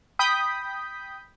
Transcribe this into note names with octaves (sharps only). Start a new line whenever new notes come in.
G5 B5 D#6 G6 B6